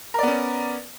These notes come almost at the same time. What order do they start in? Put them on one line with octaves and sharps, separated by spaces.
A#4 D5 B3 C#4